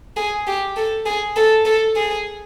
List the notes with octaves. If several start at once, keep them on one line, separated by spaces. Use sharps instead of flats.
G#4
G4
A4
G#4
A4
A4
G#4